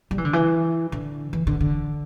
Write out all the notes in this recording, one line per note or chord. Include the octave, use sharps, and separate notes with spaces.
G3
E3
D3
E3
D3
E3
D3
D3